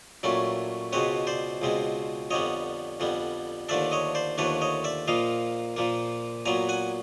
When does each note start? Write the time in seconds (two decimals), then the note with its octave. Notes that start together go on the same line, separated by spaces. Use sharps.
0.23 A#2 F#3 A3 C#4 E4
0.92 C#2 B2 G#3 C4 B4 C#5
1.27 C5 D5
1.62 C#2 B2 G#3 C4
2.31 F2 D3 G3 B3 C#5 D#5
3.00 F2 D3 G3 B3
3.69 D#2 D3 F3 A3 D4 D5 E5
3.92 C#5 D#5
4.15 C5 D5
4.38 D#2 D3 F3 A3 D4 B4 C#5
4.61 C#5 D#5
4.84 D5 E5
5.08 A#2 F3 A#3 D#5 F5
5.76 A#2 F3 A#3
6.46 A#2 F#3 B3 G#5 A#5
6.69 F#5 G#5